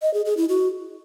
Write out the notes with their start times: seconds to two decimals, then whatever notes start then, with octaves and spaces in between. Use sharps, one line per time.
0.02 D#5
0.14 G#4
0.25 G#4
0.37 E4
0.49 F#4